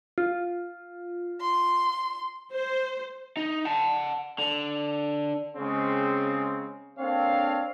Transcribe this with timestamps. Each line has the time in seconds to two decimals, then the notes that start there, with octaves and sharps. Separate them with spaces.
0.18 F4
1.41 C6
2.53 C5
3.37 D#4
3.65 F#5 A5
4.38 D3
5.57 C#3 G#3 C4
6.99 A#3 C4 D4 A4 C#5 F5